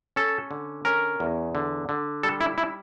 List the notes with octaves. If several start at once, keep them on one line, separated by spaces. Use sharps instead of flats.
C#4 A4
D3
C#4 A#4
E2
D3
D3
G3 A4
E4
E4